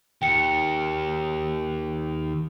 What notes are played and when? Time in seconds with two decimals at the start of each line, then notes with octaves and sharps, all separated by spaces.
0.22 D#2 G5 C#7